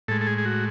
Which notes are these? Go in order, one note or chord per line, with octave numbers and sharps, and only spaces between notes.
A2 G#3 A4
A4
G#4
G#4
F#4